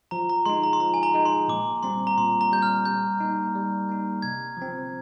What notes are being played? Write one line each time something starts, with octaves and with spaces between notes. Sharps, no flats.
F3 A#5
A#5
G#3 D#4 C6
A#5
C6
F3 A#5
G#5
A#5
G#3 D#4
C6
A#2 D6
G3 C4 C6
A#5
A#2 C6
A#5
G3 C4 G6
F6
G3 G6
A#3 D#4
G3
A#3 D#4
C3 G#6
F3 C4